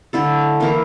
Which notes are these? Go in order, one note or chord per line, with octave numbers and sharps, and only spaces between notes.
D3 A3 E4 A4
E3 A#3 E4 A#4